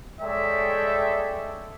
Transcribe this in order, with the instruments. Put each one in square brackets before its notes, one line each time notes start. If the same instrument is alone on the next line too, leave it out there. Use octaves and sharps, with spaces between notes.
[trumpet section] G#3 A4 C#5 D5 E5 G5